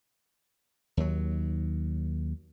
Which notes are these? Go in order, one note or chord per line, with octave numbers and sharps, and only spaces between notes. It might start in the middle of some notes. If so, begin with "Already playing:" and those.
D#2 F#3